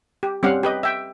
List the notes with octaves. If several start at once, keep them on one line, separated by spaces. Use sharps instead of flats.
G4
G3 C4 C#4 F5 F#5
G4 B4 D#5
E5 G5